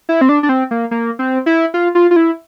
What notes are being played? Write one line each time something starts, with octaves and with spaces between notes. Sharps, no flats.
E4
C4
D4
D4
C4
A#3
A#3
C4
E4
F4
F4
F4
E4